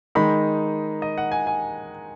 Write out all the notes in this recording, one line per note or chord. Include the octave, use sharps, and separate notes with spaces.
D#3 G#3 D#4 B5
D#5
F#5
G#5
G#5